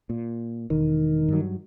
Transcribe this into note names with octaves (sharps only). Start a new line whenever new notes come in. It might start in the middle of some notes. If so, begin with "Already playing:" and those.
A#2
E1 D#3
G2 F#3